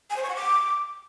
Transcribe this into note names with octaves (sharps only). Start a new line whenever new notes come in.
G#5
C5
C#6
F#5
D6